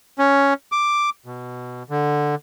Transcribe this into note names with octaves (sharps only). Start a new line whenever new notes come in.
C#4
D6
B2
D3